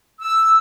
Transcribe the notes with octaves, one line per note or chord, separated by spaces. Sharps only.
E6